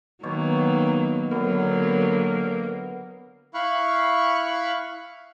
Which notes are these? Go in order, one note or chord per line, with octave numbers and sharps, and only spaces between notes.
B2 D#3 F#3 A#3 C#5 D6
D3 F#3 A#3 B3
E4 F5 B5 C#6 F#6